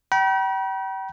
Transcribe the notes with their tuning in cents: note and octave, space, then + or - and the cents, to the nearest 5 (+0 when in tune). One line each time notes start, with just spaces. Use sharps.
G5 -35 B5 -45